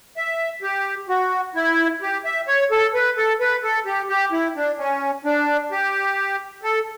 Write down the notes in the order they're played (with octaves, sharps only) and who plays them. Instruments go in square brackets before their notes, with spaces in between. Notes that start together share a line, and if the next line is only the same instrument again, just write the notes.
[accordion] E5
G4
F#4
E4
G4
E5
C#5
A4
B4
A4
B4
A4
G4
G4
E4
D4
C#4
D4
G4
A4